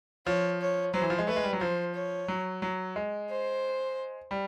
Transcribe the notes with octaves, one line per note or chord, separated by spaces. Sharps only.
F3 C#5
C#5
F#3 C5
E3
F3
G#3
A3 B4
G#3
G3
F#3
F3 C5
C#5
F#3
F#3
G#3
C5
G3